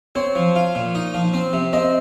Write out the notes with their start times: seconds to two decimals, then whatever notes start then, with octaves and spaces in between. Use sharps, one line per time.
0.15 C4 C#5
0.35 F3
0.56 F4
0.75 A#2
0.95 D#4
1.14 F3
1.34 C4
1.53 C3
1.73 C4 D#5